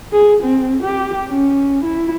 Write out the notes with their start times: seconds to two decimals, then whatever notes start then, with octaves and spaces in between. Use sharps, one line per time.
0.12 G#4
0.43 C4
0.83 G4
1.27 C#4
1.84 E4